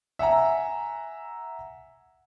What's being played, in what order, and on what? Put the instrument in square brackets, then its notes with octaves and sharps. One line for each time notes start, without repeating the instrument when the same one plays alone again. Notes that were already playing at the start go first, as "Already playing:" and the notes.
[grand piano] E5 F#5 G#5 A#5